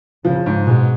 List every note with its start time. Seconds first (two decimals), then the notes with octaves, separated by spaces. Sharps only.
0.25 C#3 F3
0.46 G#2
0.67 B2 G#3